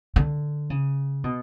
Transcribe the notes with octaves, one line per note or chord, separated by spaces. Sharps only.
D3
C#3
B2